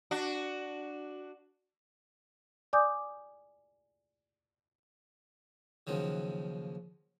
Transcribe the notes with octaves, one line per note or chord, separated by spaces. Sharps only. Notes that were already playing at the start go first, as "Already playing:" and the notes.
D4 F#4
D5 G#5 D6 D#6 G6
D#2 C#3 F3 F#3